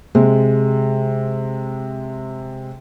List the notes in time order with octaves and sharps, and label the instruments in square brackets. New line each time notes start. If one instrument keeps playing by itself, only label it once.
[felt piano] C3 G#3